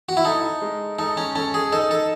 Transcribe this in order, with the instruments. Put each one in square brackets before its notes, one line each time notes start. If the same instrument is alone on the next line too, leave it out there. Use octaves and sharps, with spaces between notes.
[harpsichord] F#4
E4
[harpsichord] D#4 [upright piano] A4
[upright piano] G#3
[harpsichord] D#4 [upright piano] A4
[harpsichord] C#4
[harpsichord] C#4 [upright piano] A4
[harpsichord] G#4
[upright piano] D#4 [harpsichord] A4
[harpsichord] A4